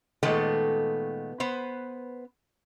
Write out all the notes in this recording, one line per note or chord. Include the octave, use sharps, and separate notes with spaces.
A#2 D#3 G#3 A3 B3 A4
B3 B4 C5